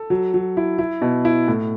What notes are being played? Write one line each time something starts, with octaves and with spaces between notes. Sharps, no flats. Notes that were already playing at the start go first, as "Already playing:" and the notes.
Already playing: A4
F#3
F#3
E4
E4
B2
E4
A2